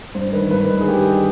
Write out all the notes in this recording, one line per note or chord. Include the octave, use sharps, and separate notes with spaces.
G2 C5
D#3 B4
G2 B4
D#3
G#4
G2 G4
D#3